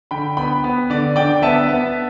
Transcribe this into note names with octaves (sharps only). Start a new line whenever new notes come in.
D3 G5 B5
B3 G5 B5
B3
D3 D5
D3 D5 G5
B3 E5 A5
B3